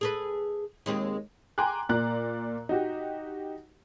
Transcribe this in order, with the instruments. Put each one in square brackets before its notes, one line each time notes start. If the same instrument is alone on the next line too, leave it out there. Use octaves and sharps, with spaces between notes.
[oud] G#4 A4 B4
D#2 G#3 C4
[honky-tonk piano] G5 G#5 A#5 C6 D6 F#6
A#2 D5 A#5 F#6
D#4 F#4 G4